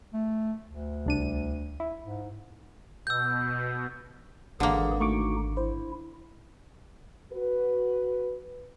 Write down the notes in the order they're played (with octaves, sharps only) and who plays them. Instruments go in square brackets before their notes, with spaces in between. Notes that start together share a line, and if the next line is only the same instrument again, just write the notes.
[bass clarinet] A3
D2
[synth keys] C2 D4 D#7
E4
[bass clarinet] G#2
[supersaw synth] B2 [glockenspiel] E6 G6
[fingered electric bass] G#1 [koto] D3 A#3 [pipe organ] E3 G#4
[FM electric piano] A3 C#6 D6 [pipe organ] D#4 F#4
[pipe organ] E4 [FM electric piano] C5
[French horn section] F#4 B4